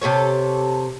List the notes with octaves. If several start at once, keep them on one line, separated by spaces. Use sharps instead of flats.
C3 G3 A4 C#5